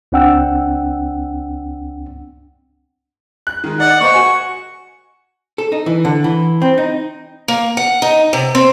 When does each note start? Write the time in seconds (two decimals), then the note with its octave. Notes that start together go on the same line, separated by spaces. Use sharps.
0.12 C#2 C4 D4 F#5 G5 E6
3.47 F#6
3.64 D#3 G#3
3.80 D5 D#5 F#5
4.01 A#3 C5 D#5 C#6
4.13 F#4 G#5
5.58 A4
5.72 D#4
5.86 E3
6.05 D3
6.24 E3
6.62 C4
6.78 D#4
7.48 A#3
7.77 F#5
8.02 D#4
8.33 C3
8.55 C4